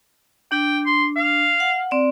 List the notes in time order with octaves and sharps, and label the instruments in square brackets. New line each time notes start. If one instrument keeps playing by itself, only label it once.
[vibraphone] D4 [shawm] G5
[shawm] C6
F5
[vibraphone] F#5
C4 D5